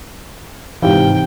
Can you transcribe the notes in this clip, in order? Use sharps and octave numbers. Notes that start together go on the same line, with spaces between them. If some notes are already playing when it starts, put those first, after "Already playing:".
G#2 C3 E3 C4 D#4 G4 F5 G5